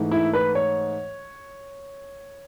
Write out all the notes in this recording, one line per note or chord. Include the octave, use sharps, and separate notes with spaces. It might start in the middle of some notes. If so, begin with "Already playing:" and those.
Already playing: G#2 E3 A3
E4
B4
C#5